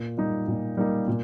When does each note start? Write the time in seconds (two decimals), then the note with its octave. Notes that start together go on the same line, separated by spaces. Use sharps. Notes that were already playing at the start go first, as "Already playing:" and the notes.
Already playing: A#2
0.18 G3 A#3 D#4
0.48 A#2
0.77 G3 A#3 D#4
1.08 A#2